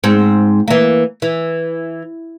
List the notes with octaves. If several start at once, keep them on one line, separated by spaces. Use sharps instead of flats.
G#2 C4
E3 A#3
E3